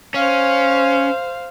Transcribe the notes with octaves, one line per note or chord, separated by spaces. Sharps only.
C#4 C5 F5